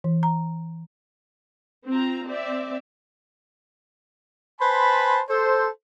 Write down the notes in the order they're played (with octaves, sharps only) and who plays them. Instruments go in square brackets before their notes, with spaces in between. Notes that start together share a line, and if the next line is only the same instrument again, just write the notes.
[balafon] E3
A#5
[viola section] C4 F4 A#5
C4 D5 E5
[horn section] B4 C5 G#5 A5 B5 C6
A4 C5